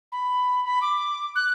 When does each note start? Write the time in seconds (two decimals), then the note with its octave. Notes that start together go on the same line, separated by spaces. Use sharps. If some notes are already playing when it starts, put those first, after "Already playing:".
0.12 B5
0.64 B5
0.81 D6
1.35 F#6